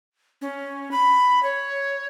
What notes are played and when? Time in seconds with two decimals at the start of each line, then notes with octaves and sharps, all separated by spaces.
0.41 C#4
0.91 B5
1.43 C#5